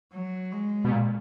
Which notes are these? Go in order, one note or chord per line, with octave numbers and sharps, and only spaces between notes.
F#3
G#3
B2
A#2